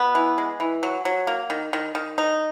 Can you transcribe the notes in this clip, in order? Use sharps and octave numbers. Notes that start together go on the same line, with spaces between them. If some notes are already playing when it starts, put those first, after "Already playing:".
Already playing: B2 B3
E3
G#3
E3
F#3
F#3
A#3
D#3
D#3
D#3
D#4